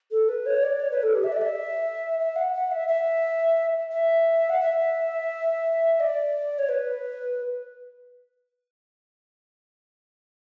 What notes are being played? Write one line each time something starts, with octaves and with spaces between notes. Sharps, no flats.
A4
B4
C#5
D5
C#5
B4
A4
G4
E5
D5
E5
E5
F#5
F#5
E5
E5
E5
F#5
E5
D5
C#5
B4